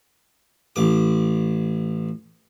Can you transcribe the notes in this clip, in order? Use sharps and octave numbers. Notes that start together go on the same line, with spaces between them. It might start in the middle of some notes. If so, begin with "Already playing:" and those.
A1 D6